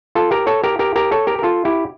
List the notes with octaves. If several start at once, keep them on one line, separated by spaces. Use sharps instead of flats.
F4 A4
G4 A#4
A4 C#5
G4 A#4
G4 A#4
G4 A#4
A4 C#5
G4 A#4
A#4
F4 A4
E4 G4